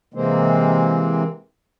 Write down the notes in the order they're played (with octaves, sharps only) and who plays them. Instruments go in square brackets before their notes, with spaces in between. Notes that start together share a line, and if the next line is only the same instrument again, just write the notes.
[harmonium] C3 E3 G#3 A#3 C4